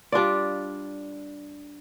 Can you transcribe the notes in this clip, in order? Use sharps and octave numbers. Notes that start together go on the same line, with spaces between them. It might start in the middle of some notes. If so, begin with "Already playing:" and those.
G3 D4 F4 D5